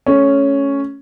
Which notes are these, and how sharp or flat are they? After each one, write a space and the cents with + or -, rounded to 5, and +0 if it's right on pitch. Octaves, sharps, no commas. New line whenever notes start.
A3 -20 C#4 +0